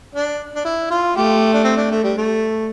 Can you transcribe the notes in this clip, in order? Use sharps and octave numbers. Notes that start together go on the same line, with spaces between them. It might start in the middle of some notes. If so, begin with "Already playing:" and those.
D4
D4
E4
F4
A3 G4
D4
C4
D4
A3
G3
A3